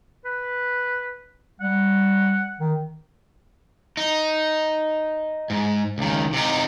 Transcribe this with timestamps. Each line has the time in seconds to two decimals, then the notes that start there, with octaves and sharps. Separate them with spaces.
0.25 B4
1.61 G3 F#5
2.59 D#3
3.97 D#4
5.50 G#2
5.98 C#2 D#3
6.33 C3 D#4